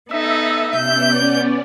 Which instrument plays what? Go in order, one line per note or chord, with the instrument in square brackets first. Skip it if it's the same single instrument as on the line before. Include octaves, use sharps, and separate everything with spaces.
[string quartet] B3 D#4 A4 [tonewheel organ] E5
[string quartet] C3 G6 [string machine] B3 C#4 D5